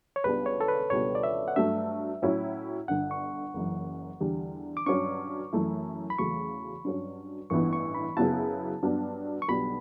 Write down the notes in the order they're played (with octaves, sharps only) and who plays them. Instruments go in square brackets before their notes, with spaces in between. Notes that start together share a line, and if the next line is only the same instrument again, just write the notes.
[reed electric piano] C#5
[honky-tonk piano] C#2 C#3 G3 B3 D4 [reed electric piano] B4
[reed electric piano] C#5
A4
B4
[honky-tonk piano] C#2 B2 G3 B3 D4 [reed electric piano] C#5
[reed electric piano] D5
E5
F#5
[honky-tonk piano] G2 F#3 A3 [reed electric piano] E5
[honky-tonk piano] A2 F#3 C#4 E4
[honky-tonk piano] G1 G2 D3 [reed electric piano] F#5
[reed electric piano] C#6
[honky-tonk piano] F#1 F#2 E3
E2 D3 G3
[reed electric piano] D6
[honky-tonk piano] G2 F#3 C#4 [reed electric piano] C#6
[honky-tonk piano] F#2 E3 A3 E4
[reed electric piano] B5
[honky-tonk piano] E2 C#3 F#3 A3 [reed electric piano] C#6
[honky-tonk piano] G2 F#3 C#4
[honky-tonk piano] A1 G2 E3 B3 E4 [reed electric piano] C#6
[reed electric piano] C#6
B5
[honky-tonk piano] F#2 C#3 F#3 B3 E4 [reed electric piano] A5
[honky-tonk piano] G2 F#3 B3 D4
[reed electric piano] C#6
[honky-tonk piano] B1 B2 G3 B3 D4 [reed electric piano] B5